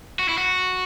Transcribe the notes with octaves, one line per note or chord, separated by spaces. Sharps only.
F#4
E4
F#4